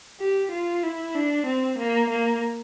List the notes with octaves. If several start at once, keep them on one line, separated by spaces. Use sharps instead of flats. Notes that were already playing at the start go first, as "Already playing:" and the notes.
G4
F4
E4
D4
C4
A#3
A#3